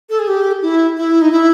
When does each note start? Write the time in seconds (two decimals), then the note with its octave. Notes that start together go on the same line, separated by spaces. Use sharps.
0.10 A4
0.19 G#4
0.28 G4
0.62 E4
0.97 E4
1.22 D#4
1.32 E4